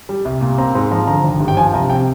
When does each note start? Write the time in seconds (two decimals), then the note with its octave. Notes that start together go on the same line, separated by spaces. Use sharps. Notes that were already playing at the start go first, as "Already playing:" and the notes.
0.09 G3
0.25 C2
0.41 A#2
0.58 C4 A#5
0.75 G#2 A#5
0.91 F3 A#5
1.07 D3 A#5
1.24 G#1
1.40 G2
1.48 G5
1.57 F3 G#5
1.73 C2 A#5
1.89 C3 G5